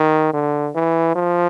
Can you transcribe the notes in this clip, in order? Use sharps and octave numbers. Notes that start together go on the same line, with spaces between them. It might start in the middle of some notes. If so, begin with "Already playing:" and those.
Already playing: D#3
D3
E3
F3